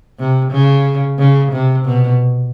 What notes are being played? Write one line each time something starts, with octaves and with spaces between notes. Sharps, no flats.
C3
C#3
C#3
C3
B2